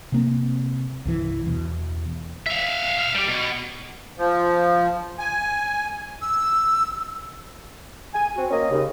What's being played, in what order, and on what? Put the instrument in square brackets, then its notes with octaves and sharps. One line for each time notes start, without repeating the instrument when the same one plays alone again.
[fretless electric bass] C3 A#3 C4
C2 G2 E3
E2 B2
[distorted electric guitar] E5 F5
E5 F5
G3 G4
B2
[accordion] F3
G#5
[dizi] E6
[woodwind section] G#5
C4 F#4
A#3 C#4 D#5
D#2 C#3